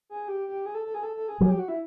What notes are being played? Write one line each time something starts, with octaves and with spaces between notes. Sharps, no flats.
G#4
G4
G4
G#4
A4
A4
G#4
A4
A4
G#4
F#3 G#4
G4
F#4
E4